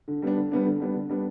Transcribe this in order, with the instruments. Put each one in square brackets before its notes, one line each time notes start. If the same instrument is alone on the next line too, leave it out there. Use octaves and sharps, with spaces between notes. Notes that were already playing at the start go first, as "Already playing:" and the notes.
[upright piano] D3
G3 B3 D4
D3
G3 B3 D4
D3
G3 B3 D4
D3
G3 B3 D4